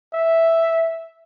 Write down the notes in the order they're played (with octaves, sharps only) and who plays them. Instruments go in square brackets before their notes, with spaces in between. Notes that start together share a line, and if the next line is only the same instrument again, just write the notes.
[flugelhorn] E5